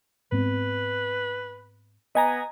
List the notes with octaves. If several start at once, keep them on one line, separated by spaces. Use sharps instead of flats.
G#2 B3 C4 B4
B3 D#5 G#5 A#5